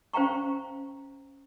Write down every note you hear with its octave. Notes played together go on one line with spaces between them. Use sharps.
C#4 C5 F5 G5 A#5 C#6